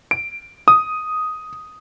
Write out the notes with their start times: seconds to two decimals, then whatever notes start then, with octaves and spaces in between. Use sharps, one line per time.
0.11 D7
0.68 D#6